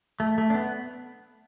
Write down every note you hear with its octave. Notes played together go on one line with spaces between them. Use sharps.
A3
A3
D4
B3